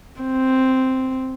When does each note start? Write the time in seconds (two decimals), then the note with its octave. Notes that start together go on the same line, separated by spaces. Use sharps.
0.21 C4